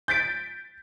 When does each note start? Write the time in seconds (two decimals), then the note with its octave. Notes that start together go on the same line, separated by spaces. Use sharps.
0.08 G6 A6 B6 D7